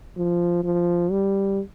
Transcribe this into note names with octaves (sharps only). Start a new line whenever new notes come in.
F3
F3
G3